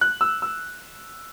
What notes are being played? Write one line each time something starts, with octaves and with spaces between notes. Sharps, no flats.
F#6
E6
E6